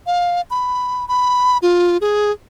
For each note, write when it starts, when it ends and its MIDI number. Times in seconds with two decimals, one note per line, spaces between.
0.07 0.41 77
0.50 1.07 83
1.08 1.58 83
1.62 1.97 65
2.01 2.31 68